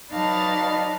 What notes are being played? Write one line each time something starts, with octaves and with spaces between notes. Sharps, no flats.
F#3 D#4 B4 D5 F5 A5